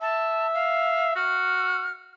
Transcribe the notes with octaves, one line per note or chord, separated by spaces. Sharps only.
E5 A5
F5
F#4 F6